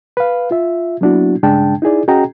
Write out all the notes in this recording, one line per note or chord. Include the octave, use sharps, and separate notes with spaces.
B4 F5
F4 E5
F#3 A#3 B3 D4 E4 F#4
G2 C#3 G#3 D4 G5 A5
D#4 E4 G#4 D5
C#4 F#4 G#4 D#5 G5 A#5